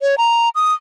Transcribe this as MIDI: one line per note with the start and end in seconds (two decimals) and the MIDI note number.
0.01 0.15 73
0.18 0.49 82
0.55 0.73 87